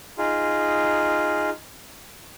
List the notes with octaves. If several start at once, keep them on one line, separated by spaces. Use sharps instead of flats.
D#4 F4 G#4